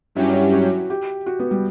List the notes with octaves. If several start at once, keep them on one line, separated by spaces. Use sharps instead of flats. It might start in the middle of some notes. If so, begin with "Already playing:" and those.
G2 F#3 C#4 E4 G4
E4
F#4
G4
F#4
B3
G3